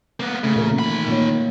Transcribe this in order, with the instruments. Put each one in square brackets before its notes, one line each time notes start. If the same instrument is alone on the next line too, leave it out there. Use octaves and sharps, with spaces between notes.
[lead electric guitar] A#3 B3
[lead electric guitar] C#3 [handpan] A3
[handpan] A#2 E3 A#4
[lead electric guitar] D#3 B5
[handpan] A#2 A#3 C#5
A#3